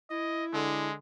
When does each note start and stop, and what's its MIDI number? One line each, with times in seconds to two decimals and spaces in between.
0.10 0.88 64
0.10 0.45 75
0.53 0.94 50
0.53 0.93 56